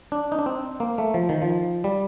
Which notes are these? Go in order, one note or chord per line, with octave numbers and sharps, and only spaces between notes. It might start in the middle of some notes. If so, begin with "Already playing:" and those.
D4
D#4
D4
C4
A#3
A3
F3
D#3
F3
G3